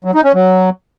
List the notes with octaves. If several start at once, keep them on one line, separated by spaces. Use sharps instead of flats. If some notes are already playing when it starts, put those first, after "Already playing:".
F#3
D#4
C#4
F#3